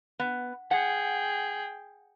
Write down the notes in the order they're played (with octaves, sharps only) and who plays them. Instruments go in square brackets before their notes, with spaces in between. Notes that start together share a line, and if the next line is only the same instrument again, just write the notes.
[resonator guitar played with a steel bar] B3
[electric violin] G#4 G5 [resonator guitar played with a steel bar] F#5